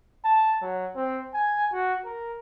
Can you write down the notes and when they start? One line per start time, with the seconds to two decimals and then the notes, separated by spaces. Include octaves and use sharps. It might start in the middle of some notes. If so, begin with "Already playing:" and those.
0.25 A5
0.62 F#3
0.96 C4
1.34 G#5
1.73 F#4
2.05 A#4